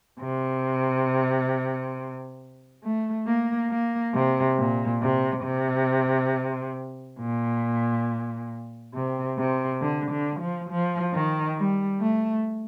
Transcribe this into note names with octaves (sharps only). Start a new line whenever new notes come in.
C3
A3
A#3
A#3
C3
A#2
C3
C3
A#2
C3
C3
D3
D3
F3
F3
D#3
G3
A3